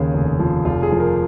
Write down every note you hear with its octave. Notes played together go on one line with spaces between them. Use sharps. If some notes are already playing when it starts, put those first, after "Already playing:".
Already playing: D#2 C#3 G#4
F1
F3
F1 F4
G#4
F3
A#4